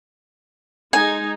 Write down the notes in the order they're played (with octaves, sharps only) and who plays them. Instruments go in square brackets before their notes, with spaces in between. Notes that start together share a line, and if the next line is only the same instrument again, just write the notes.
[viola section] G#3 D#4 [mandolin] G#5